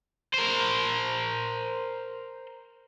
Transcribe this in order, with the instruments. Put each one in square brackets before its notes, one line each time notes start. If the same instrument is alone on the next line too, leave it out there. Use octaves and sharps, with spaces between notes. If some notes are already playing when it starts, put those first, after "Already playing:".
[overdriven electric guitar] A#4 C5